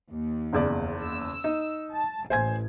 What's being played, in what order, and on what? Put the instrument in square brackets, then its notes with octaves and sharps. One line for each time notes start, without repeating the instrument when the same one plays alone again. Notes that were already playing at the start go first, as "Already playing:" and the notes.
[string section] D#2
[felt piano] F#1 E2 D5
[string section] E6
[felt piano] D#4
[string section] A5
[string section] A1 [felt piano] C5 G#5 G#6